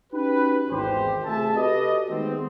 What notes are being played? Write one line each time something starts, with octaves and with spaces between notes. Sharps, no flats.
C#4 D#4 F#4 G4 B4
G#1 E2 G4 C5
C3 A3 F4 G#4 E5 A5
F#4 G4 A4 B4 D5 D#5
D#3 G#3 A3 B3 C4